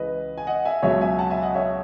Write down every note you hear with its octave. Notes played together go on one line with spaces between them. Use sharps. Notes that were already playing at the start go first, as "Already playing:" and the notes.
Already playing: C#2 C#3 E3 B4 D#5
G#5
D#5 F#5
E5 G#5
C#2 B2 F#3 C#5 E5
E5 G#5
F#5 A5
E5 G#5
D#5 F#5
C#5 E5